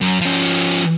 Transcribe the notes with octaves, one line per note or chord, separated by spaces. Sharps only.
F#2
F3 C#4